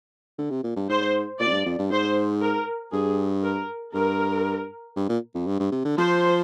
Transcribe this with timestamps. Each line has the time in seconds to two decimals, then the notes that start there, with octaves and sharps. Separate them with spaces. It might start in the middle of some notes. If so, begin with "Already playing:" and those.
0.38 D3
0.50 C3
0.63 A#2
0.76 G2
0.89 G#2 C5
1.40 A#2 D5
1.47 F2
1.52 G2
1.65 F2
1.79 G2
1.91 G#2 C5
2.42 A#4
2.92 G2 G#4
3.43 A#4
3.95 G2 A#4
4.96 G2
5.09 A#2
5.35 F2
5.46 G2
5.59 G2
5.72 C3
5.85 D3
5.98 F3 C5